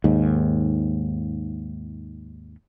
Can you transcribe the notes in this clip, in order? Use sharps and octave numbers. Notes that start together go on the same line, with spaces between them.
D#2 G#2